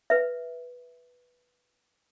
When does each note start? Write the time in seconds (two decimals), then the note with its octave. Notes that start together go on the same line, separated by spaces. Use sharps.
0.10 B4 E5